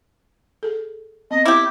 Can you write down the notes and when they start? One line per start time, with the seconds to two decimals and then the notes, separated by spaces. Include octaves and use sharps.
0.63 G#4 A4
1.31 B3 C4 D#5
1.45 E4 G4 D6